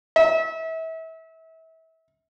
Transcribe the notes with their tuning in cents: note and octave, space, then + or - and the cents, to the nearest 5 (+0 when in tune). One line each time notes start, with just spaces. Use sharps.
E5 -30